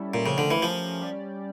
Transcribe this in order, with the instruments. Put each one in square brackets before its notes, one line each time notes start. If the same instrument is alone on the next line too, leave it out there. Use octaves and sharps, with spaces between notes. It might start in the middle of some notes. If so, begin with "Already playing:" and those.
Already playing: [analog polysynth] G3 C#4 E4 A4
[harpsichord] A#2
[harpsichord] C#3 [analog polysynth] F3 A3 C#4 G4 A#4
[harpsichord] D3
E3
F3
[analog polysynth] G3 C#4 G4 D5